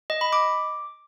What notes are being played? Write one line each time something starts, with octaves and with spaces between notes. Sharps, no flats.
D#5
B5
D6